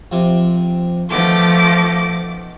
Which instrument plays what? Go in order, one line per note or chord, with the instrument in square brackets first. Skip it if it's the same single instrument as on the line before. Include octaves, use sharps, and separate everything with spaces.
[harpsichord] F2 C3
[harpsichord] B2 D#3 C6 [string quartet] F3 A3 D6